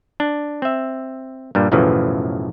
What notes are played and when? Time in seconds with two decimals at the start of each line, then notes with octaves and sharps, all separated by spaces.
0.20 D4
0.62 C4 E5
1.55 G2 A#2 G3
1.72 B1 F#2 A2 C#3 E3 F3